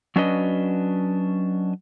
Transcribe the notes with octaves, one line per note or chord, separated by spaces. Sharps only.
F#3 C#4 D4 F#4 B4 D#5